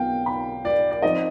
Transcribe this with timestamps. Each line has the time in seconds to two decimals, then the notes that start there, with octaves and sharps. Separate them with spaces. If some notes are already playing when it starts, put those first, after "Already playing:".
Already playing: B1 B2 B3 D#4 F5 G5
0.26 B5
0.65 D5
0.91 D5
1.02 F3 C4 D#4 D#5